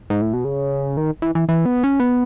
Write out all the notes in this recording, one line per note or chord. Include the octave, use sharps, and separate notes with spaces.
G#2
A2
B2
C#3
D#3
E3
E3
E3
B3
C#4
B3